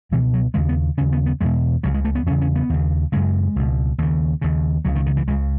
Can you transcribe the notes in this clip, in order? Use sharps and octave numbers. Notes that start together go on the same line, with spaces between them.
C#2 B2 E3
F#3
D#2 C#3 G#3
B3
D#2 C#3 C#4
B3
B3
E2 B2 G#3
C#2 C#3 F#3
G#3
A3
B3
E2 C#3 C#4
C#4
B3
D#2 C#3
F#2 C#3 G#3
C#2 B2
D#2 C#3
D#2 C#3
C#2 C#3 F#3
D#3
D#3
E3
C#2 C#3 G#3